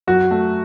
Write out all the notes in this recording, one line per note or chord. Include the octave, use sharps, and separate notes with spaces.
F#2 F#4
A3